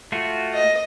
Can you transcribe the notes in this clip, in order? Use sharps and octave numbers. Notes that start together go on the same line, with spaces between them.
A3 F4 F#4
D#5